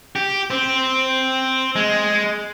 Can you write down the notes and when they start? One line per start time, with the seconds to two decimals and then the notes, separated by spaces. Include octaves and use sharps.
0.16 G4
0.50 C4
1.76 G#3